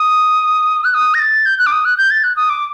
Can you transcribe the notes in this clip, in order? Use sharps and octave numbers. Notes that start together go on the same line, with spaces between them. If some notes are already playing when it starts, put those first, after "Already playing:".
Already playing: D#6
F#6
D#6
A#6
A6
G6
F#6
D6
D#6
F#6
G6
A6
F#6
D#6
D6